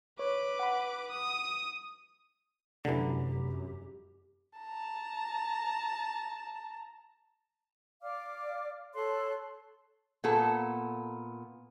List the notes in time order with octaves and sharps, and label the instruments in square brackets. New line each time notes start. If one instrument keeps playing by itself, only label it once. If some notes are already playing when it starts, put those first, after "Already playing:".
[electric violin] B4 D6 [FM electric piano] C#5
[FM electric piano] F#5 B5
[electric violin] D#6
[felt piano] F1 A#5 B5 [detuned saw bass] F#2 [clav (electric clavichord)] D3 E3 [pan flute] G4
[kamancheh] A5 A#5
[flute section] D5 F5 D6 F6
A4 C#5 C6 F#6
[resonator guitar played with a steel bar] A#2 B3 A4